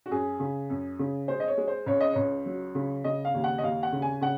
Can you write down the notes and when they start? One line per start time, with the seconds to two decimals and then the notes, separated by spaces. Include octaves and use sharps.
0.06 F#4
0.11 F#2 G#4
0.40 C#3
0.70 F#2
0.99 C#3
1.28 G#3 C5
1.40 D#5
1.48 C#5
1.58 G#3
1.68 C5
1.86 C#2 C#5
2.00 D#5
2.13 C#2 C#5
2.46 F#3
2.75 C#3
3.04 C#3 D#5
3.25 F5
3.34 D#2
3.44 F#5
3.58 D#5
3.63 D#2 F5
3.83 F#5
3.92 C#3
4.02 G#5
4.21 C#3 F#5